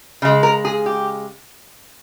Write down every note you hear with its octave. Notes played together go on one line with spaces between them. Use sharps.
C#3 G#3
A#4
G#4
G4